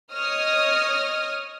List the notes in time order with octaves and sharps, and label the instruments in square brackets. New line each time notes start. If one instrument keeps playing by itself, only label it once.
[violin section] C#5 D#5 D#6 F6